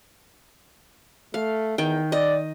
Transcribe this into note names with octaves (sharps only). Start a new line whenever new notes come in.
A3 F5
E2 D#3 G5
D5 D#5